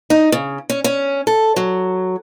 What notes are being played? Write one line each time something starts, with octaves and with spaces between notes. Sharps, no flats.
D#4
C#3
C#4
C#4
A4
F#3